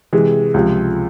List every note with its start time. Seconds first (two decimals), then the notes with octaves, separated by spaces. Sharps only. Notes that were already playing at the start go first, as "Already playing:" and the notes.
0.13 C3 E3 G#3
0.54 C#2 C3 F3